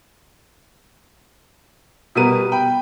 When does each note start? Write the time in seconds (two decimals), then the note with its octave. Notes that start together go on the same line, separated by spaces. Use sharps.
2.15 B2 G3 B3 A#4 D#7
2.52 G5 B5